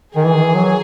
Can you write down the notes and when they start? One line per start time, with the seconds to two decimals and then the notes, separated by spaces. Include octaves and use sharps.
0.16 D#3 G#4
0.26 E3
0.35 D#3
0.45 E3
0.54 F#3